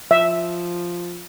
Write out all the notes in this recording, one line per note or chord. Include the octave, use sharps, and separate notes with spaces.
F3 E5